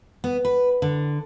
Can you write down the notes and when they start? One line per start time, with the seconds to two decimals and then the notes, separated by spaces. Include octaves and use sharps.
0.24 B3
0.45 B4
0.82 D3